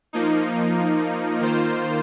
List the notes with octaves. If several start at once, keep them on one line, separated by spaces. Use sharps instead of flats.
F3 A#3 D#4
D#3 A#3 F4 C5